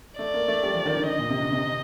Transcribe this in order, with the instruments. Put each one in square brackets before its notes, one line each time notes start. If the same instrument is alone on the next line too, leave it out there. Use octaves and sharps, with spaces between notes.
[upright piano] A3 [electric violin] D5
[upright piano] A#3
A3
G3
F3
D#3
D3
[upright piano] D3 [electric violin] D#5
[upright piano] A#2
C3
D3
C3